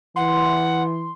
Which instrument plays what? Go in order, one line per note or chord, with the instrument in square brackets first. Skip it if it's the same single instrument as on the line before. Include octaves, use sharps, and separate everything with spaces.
[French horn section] E3 [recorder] F#5 [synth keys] C6